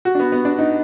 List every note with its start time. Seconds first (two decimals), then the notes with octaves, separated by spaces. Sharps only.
0.05 F#4
0.15 D4
0.20 B3
0.32 B3
0.45 D4
0.59 D#4